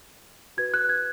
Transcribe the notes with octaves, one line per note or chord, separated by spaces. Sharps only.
F#4 B4 G#6
F#6
G#6